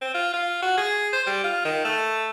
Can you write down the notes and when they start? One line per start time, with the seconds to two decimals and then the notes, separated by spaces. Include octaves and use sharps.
0.01 C4
0.14 F4
0.33 F4
0.62 F#4
0.77 G#4
1.13 C5
1.27 G3
1.44 F4
1.65 D#3
1.85 A3